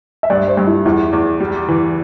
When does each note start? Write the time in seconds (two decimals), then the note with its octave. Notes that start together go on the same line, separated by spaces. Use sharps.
0.23 E5
0.30 G2 D5
0.48 C5
0.57 G2
0.67 E4
0.85 E2 E4
1.13 E2
1.40 G3
1.68 E3